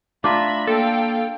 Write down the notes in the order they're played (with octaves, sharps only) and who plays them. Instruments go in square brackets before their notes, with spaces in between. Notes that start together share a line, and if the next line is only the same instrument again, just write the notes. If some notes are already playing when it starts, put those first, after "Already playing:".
[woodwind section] A3 A#5 [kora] D4 F4 [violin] E5 B5
[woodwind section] A#3 [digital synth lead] A4 [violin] F5 G5